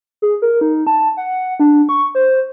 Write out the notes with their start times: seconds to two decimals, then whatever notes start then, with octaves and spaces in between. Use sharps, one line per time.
0.22 G#4
0.42 A#4
0.61 D#4
0.87 A5
1.17 F#5
1.60 D4
1.89 C#6
2.15 C5